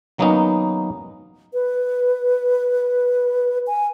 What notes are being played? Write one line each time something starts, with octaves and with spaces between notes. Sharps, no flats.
D#3 F#3 A#3 B3 C#4 D#4
B4
G#5